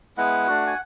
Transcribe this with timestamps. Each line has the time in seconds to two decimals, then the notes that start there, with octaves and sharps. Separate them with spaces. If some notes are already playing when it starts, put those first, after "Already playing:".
0.17 G#3 B3 E4 F#5
0.48 A3 D4 F#4
0.67 G#5